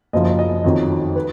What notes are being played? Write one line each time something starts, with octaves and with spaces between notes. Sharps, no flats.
F#1 F#2 F3 D#5
D#5
F2 D#3 F#3
B4